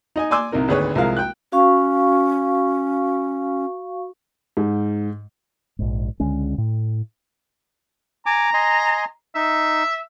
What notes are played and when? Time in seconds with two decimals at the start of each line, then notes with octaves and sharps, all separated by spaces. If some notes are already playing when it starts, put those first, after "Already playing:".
0.16 D#4 D#5 G#5
0.31 D5 G#5 C6 D6 E6
0.52 C2 C3 D#4 A#4
0.68 G#1 D2 G#4 B4 C#5
0.95 C2 F3 G#3 A#4 F5
1.17 G5 F#6
1.52 C#4 F#4 F5 C#6
4.57 G#2
5.79 A#1 G#2
6.20 C#2 D3 G#3 C#4
6.58 A2
8.26 G#5 A#5 D6
8.54 D#5 G#5 C6
9.35 D#4 E5